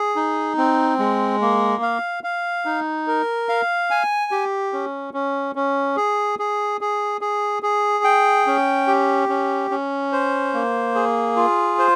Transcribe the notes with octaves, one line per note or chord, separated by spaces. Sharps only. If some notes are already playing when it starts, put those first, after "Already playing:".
Already playing: G#4
D#4
C4
G#3
A#3
F5
F5
D#4
A#4
F5
G#5
G4
C#4
C#4
C#4
G#4
G#4
G#4
G#4
G#4
G5
C#4
G4
C#4
C#4
C5
A#3
G#4
F4
C5